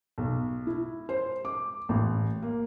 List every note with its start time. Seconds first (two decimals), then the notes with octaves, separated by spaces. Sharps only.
0.18 B1
0.67 E4
1.09 C5
1.45 D6
1.89 A1
2.42 A#3